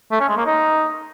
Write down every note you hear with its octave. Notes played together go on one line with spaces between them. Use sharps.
A3
C#4
G#3
A#3
D#4